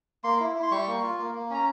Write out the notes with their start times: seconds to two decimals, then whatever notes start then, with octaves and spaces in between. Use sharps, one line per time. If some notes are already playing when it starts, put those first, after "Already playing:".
0.24 A#3 C6
0.40 E4
0.56 E4
0.63 C6
0.71 G3 C#6
0.87 A#3
1.03 F4
1.19 A#3
1.35 A#3
1.50 C#4 A#5